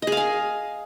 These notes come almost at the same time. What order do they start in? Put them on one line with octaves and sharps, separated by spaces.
D#5 G#4 F5 G#5